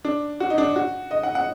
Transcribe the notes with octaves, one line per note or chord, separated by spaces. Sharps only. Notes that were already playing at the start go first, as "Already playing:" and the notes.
D4
F#4
D#4
D4
F#4
D#5
F#5
F#5